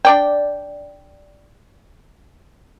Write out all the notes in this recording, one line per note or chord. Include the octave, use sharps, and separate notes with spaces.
D4 D5 G5